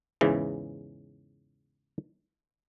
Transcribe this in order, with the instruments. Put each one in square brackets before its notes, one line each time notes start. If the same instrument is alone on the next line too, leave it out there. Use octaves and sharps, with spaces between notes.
[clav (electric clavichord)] E2 G#2 C#3 E3